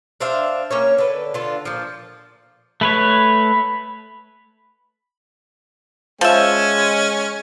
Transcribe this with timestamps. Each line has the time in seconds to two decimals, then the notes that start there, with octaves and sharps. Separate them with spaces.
0.20 D4 C5 E5 F5
0.70 A#3 C#4 C#5
0.98 D3 B4
1.34 D3 F4
1.65 A#2 F3
2.81 A3 B4 C#5 B5
6.21 F3 G#3 C#4 E5